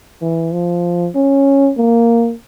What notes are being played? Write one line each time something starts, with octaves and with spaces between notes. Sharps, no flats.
E3
F3
C#4
A#3